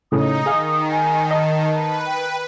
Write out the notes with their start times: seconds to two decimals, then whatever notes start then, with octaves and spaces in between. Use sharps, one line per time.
0.12 A2 C#3 D#4 D#6
0.46 D#3 G#4 F5
0.91 G#5
1.31 D#5 A5
1.70 B4 A5
2.06 G5